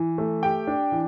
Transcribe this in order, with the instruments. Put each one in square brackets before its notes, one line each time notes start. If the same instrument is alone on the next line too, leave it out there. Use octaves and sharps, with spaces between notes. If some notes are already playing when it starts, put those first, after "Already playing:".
Already playing: [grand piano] E3
A3
[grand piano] G4 [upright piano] G5
[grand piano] D4
E3